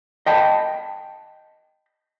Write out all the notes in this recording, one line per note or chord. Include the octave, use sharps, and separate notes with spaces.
D#5 G5 A5 B5